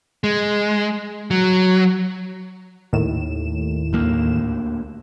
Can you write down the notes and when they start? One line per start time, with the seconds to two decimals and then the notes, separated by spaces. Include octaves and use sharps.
0.24 G#3
1.31 F#3
2.93 D#2 A2 E7
3.93 D2 A#3